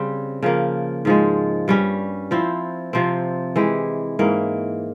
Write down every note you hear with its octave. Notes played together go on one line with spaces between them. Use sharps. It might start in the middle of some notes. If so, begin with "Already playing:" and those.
Already playing: C#3 G3 C4
C#3 F3 A#3
G#2 F3 G#3
G2 G3 C#4
F3 C4 E4
C3 F3 C4
E3 G#3 E4 G4
G#2 E3 A#3